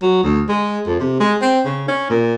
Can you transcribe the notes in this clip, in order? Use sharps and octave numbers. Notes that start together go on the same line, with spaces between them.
F#3
D2
G#3
F2
C3
G#3
C4
C#3
C#4
A#2